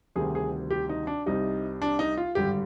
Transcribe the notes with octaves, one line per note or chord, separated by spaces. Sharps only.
D2 C3 D#3 G3 G#4
G#4
G4
D#4
D4
C2 C3 G3 D#4
D4
D#4
F4
G#1 G2 D3 G3 G4